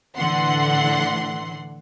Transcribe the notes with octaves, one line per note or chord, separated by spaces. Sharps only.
A2 D3 E3 F#5 C6